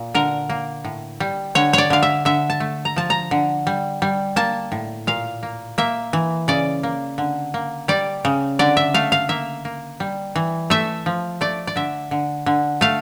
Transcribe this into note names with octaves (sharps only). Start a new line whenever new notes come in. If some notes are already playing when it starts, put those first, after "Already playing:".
Already playing: A#2
D3 A#4
A#3
A2
G3
D3 C#5
C#5 D5
D3 F5
E5
D3 E5
A5
A3
A#5
F3 A5
A#5
D3
G3
G3
A#3 A5
A2
A#2 F5
A#3
A#3 E5
E3
C#3 D5
A#3
D3
A#3
G3 D5
C#3
D3 D5
E5
A3 F5
F5
A#3 E5
A#3
G3
E3
A3 E5
F3
A3 D5
D5
D3 E5
D3
D3
A3 F5